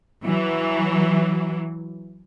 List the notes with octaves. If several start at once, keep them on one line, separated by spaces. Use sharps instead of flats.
E3 F#3